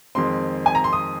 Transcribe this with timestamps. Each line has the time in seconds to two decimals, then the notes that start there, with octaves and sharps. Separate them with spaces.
0.15 F2 D#3 G#3 C4 C6
0.66 G#5
0.75 A#5
0.84 C6
0.93 D#6